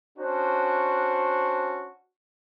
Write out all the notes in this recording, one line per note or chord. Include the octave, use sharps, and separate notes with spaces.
C#4 D4 F#4 C5